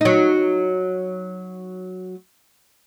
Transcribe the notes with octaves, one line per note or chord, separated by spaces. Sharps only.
F#3 D#4